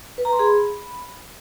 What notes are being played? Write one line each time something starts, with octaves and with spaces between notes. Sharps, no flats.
B4
A#5
C6
G#4
B5